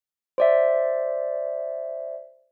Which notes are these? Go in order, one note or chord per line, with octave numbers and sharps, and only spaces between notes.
C5 D5 E5